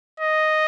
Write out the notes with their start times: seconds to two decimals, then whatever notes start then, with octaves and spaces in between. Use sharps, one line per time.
0.20 D#5